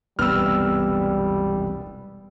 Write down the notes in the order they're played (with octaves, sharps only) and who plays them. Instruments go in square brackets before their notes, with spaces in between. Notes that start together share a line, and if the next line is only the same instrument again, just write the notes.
[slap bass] E1 C2 F#2 [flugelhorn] G3 [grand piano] B3 [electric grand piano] E6 F6